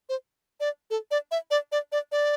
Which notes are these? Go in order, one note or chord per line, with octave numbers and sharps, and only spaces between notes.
C5
D5
A4
D5
E5
D5
D5
D5
D5